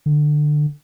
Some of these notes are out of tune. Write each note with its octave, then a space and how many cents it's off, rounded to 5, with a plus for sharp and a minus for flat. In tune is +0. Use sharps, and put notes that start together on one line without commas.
D3 +20